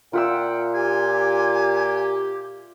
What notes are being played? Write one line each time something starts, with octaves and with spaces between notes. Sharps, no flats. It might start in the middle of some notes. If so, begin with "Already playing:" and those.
A#2 F4 E5 F#5 G5 E6
G4 G#5